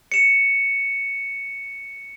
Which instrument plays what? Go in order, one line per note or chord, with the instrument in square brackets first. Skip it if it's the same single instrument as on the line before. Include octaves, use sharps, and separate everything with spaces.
[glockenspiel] C#7 E7